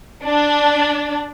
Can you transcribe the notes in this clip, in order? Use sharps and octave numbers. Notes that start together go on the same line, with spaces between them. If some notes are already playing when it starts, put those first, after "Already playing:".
D4